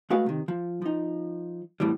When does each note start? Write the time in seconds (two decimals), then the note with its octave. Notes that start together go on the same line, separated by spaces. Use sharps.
0.10 G#3 A3 F#4 B4 F5
0.26 C3 D#3
0.48 F3
0.82 F3 D#4
1.80 F2 A2 E3 G3